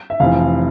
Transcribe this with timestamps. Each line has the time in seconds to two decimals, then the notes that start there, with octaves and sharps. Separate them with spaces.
0.10 E5
0.20 F1 F2 E3 F5